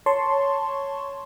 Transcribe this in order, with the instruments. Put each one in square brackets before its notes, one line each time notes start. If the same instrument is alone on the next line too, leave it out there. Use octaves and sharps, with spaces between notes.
[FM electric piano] C#5 A5 C6 C#6